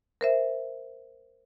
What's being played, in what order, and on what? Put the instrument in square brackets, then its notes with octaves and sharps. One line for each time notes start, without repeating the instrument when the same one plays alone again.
[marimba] A#4 C5 E5